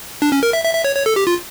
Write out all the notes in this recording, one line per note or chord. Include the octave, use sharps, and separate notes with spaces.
D4
C#4
A#4
E5
E5
E5
C#5
C#5
A4
G4
F4